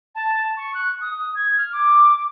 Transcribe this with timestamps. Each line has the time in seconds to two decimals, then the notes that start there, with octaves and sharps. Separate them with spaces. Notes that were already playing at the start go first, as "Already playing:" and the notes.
0.15 A5
0.57 C#6
0.74 F#6
1.01 D#6
1.35 G#6
1.58 F6
1.72 D6